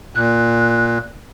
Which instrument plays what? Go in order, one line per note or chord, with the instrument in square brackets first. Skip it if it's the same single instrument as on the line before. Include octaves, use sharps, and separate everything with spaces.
[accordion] A#2 [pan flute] F#6